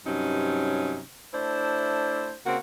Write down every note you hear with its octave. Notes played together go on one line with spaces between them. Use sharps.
G2 C3 F#3 C#4 D#4
A3 D4 E4 C5
C#3 A#3 C4 F#4